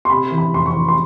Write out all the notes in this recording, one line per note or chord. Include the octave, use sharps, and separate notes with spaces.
C6
C3 B5
E3
B5
F1 C6
C#6
E3
C6